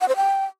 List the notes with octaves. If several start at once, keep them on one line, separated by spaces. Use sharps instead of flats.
F#5
C5
G5